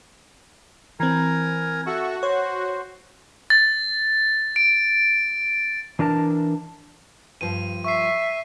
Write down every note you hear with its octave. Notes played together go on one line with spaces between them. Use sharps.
E3 C4 A#4 G#5 A#5
F#4 A4 E5 C#6
C5 C#5
A6
D7
E3 D4 A#4 A5
G2 F3 D#7
E5 C#6 C7